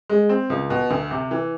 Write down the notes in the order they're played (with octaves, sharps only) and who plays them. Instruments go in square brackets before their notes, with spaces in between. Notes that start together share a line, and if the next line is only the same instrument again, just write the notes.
[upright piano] G#3
C4
C#2
B2
D2
C3
E3